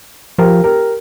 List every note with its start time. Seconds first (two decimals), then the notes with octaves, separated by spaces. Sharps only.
0.38 F3 G4 A#4
0.64 G4 A#4